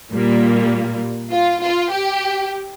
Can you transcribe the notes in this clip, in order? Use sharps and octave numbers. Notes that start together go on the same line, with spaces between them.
A#2 G3 A#3
F4
F4
G4